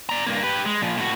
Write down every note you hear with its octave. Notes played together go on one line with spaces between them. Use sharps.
D5 A#5
G2 A#3
G4 B4
G#3
A#2 F3
A2 F#4